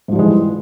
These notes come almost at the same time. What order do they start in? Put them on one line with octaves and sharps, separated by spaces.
G#2 F3 G3 G#3 E3